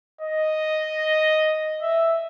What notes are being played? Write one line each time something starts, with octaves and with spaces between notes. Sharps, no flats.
D#5
E5